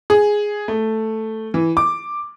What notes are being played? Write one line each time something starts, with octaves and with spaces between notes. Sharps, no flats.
G#4
A3
E3
D6